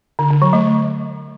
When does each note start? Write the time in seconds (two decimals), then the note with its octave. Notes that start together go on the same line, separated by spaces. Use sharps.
0.19 D3
0.30 D3
0.42 F#3
0.53 A3